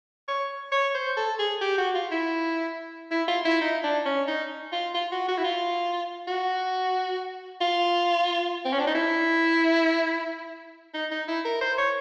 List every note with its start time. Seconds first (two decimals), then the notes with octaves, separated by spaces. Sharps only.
0.28 C#5
0.72 C#5
0.94 C5
1.17 A4
1.39 G#4
1.61 G4
1.78 F#4
1.95 F4
2.11 E4
3.11 E4
3.28 F4
3.45 E4
3.61 D#4
3.83 D4
4.05 C#4
4.28 D#4
4.72 F4
4.94 F4
5.12 F#4
5.28 F#4
5.38 E4
5.44 F4
6.28 F#4
7.61 F4
8.65 C4
8.72 C#4
8.80 D4
8.87 D#4
8.95 E4
10.94 D#4
11.11 D#4
11.28 E4
11.45 A#4
11.61 C5
11.78 C#5